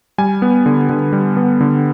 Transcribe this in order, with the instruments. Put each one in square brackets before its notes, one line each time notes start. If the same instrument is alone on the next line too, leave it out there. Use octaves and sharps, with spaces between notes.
[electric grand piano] G3 G#5
B3
D3
D3
G3
B3
D3